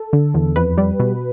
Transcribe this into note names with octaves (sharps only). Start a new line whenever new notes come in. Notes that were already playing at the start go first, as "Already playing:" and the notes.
Already playing: A4
D3
E2
F2 B4
G3
B2